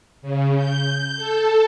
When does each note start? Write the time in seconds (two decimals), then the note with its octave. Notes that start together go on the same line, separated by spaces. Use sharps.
0.22 C#3
0.57 G6
1.17 A4